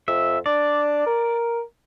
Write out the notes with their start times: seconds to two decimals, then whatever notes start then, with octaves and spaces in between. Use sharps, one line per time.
0.08 F2 E5
0.46 D4 D5
1.06 A#4